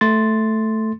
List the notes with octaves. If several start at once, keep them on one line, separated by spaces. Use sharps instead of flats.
A3 C6 A6